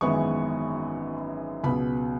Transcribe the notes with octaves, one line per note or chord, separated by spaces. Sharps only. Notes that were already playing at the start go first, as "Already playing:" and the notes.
G#1 F#2 E3 G#3 B3 C#6
C#2 B2 F#3 B3 B5